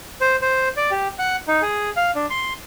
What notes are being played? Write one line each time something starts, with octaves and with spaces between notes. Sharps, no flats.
C5
C5
D5
G4
F#5
D#4
G#4
F5
D4
C6